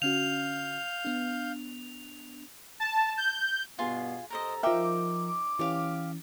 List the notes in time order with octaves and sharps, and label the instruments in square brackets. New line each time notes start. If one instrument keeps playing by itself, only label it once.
[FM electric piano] D3 C#4 F#4 [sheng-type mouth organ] F5 G6 [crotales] F7
[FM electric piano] B3 D4
[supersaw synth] A5
G6
[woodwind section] G2 B2 B3 [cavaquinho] F4 G#4 C6
[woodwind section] C3 A4 A#5 [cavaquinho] A#4 C5 D#5
[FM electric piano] F3 A#4 [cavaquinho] D#4 E5 G5 [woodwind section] D6
[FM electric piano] E3 C#4 [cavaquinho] G4 F5